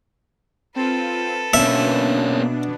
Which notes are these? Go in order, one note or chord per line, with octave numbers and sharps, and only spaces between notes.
C4 F4 A4 B4
B2 A#3 B3 C#4 D4 E5